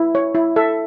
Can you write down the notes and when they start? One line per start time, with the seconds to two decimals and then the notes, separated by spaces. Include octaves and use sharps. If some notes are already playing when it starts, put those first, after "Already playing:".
Already playing: E4
0.15 C#5
0.35 E4
0.56 A4 E5